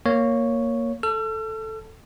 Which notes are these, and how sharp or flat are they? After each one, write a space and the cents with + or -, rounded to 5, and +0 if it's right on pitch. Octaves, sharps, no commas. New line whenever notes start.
A#3 +0 C#5 +0
A4 +0 E6 +45